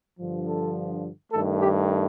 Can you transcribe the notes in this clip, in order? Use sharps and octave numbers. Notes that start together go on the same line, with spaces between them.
G2 D3 F3
A4
G2 D#3 A3 A4
G4